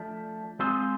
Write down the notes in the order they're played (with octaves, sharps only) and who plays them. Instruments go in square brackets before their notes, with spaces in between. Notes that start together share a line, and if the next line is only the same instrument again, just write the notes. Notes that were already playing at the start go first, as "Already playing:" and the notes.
Already playing: [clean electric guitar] F3 A3 D4
G#3 C4 F4 G#4 C5